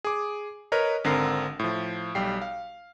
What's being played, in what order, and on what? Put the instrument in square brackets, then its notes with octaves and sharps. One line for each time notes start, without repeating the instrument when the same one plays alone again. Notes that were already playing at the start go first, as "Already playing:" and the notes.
[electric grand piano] G#4 D6
A#4 B4 C#5 D#5
G#1 D3 C4 A#4 A#5 C7
A2 F3
B1 G3 G5 C7
F5